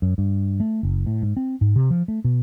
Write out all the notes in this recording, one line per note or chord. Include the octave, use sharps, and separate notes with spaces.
F#2
G2
A3
F#1
A2
G#2
C4
G#2
C3
F3
A3
B2